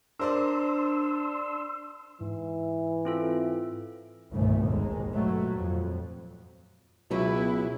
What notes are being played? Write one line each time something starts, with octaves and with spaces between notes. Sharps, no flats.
D4 A#4 C5 D5 C6 E6
G#2 E3
C4 F4 A4
G1 C2 A#2 D#3 A3
G#1 D#2 G#3
G2 A#2 F#3 A3
F2
C#2 B2 F#3 E4 B4